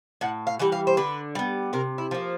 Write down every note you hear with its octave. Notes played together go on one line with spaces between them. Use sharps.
A2 F#5
F5
E3 G3 F#5
F5
C5
D3 B4
G3 B3
C3 A#4
E4
F3 A#3